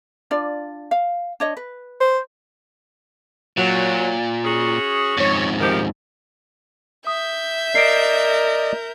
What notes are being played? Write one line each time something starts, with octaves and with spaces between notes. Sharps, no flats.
D4 F4 D5
F5
D4 C#5 D#5
B4
C5
A#2 F#3
C#4 F#4 G#4
F2 G#2 C#5
D#3 F3 G4
E5 D#6 G6
A#4 D5 D#5 C7 D7